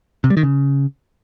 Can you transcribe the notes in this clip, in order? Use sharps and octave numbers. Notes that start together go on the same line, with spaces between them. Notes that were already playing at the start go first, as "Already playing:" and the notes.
C3
G3
D#3
C#3